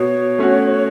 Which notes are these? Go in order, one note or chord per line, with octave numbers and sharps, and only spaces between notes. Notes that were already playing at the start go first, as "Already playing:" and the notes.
Already playing: B2 C#5
A3 C#4 F#4